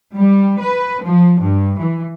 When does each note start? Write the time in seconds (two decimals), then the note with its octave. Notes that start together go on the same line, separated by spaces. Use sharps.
0.13 G3
0.60 B4
1.02 F3
1.40 G2
1.79 E3